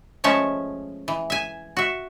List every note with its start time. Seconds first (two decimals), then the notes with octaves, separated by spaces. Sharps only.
0.24 F3 G#3 A3 C#4 E5
1.08 E3
1.30 E5 G#5
1.77 F#4 E5